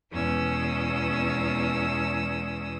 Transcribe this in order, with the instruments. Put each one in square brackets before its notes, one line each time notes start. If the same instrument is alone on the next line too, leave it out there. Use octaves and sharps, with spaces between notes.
[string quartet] E2 B2 G#3 C#4 D#6 E6